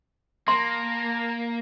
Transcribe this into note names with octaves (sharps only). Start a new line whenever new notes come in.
A#3 A#5 C6